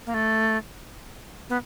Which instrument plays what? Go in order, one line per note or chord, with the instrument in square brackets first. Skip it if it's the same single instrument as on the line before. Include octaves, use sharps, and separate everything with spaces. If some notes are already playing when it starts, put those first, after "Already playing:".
[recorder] A#3
A3
B3